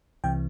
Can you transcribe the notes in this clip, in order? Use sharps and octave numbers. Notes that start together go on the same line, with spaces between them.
C2 C3 E3 G5